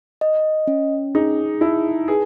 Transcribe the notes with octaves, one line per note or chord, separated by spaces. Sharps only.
D#5
C#4
D#4 G#4
E4 A5
G#4 B4